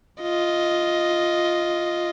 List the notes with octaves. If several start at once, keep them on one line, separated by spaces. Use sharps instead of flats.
F4 D#5